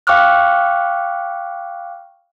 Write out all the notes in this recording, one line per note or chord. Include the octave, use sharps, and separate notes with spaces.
F5 G5 C#6 D6 F6 F#6